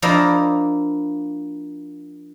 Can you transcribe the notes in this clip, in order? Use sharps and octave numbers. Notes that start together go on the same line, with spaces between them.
F3 A#3 D4 E4 D#5